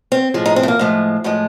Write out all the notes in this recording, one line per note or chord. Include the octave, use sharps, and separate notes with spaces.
C4
A2 F3 G#3
D#4
C4
A3
A#3
A2 F3 G#3
A2 F3 G#3